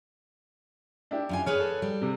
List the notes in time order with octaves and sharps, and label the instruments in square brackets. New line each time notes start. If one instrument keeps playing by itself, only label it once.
[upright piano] D4 E4 G4
[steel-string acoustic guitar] F#2 F4 G#5
[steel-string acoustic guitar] G#4 B4 C#5 [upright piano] F6
[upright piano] A4
[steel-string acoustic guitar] G3
[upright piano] C3